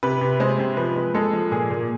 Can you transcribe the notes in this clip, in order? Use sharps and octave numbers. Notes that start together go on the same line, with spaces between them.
C3 B4
C3
G#3 C5
C3
F3 B4
G#3
G#3 A4
F3
A#2 G#4
A#2